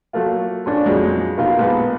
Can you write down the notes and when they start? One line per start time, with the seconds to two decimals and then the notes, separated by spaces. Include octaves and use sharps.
0.13 F#3 A3 A#3 F4
0.66 A#1 C#4 D4
0.86 F2 A#2 F#3 G#3
1.37 B2 A#3 D#4 F4
1.58 A#1 G#3 B3